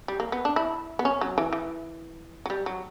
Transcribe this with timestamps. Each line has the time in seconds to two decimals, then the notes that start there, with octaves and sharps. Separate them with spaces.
0.08 G3
0.20 A#3
0.32 B3
0.45 D4
0.56 E4
0.99 B3
1.05 C#4
1.21 F#3
1.38 E3
1.53 E3
2.46 F#3
2.50 G3
2.66 F#3